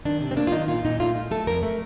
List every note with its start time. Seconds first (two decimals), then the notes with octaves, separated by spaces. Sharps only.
0.05 D#3 D4
0.21 C3 D4
0.31 C4
0.37 A#3 D4
0.47 F4
0.52 D#3 D#4
0.68 A#2 F4
0.85 A#2 D#4
1.00 A3 F4
1.16 A3
1.31 A3 A4
1.47 F2 A#4
1.63 A3